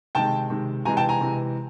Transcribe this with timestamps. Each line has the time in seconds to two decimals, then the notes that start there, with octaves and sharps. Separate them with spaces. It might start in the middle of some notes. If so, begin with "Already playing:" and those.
0.15 C3 D#3 G#3 G5 A5
0.50 C3 D#3 G#3
0.85 C3 E3 G#3 G#5 A#5
0.97 G5 A5
1.09 G#5 A#5
1.21 C3 E3 G#3